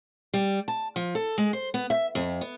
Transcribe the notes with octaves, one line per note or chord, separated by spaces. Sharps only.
G3
A5
F3
A4
G#3
C5
B3
E5
F2
B3